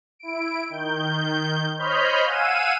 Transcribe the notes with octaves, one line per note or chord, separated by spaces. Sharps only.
E4 D7
D#3 G6
C5 C#5 D#5 B5 F6 G6
F5 F#5 G#5 E6 D#7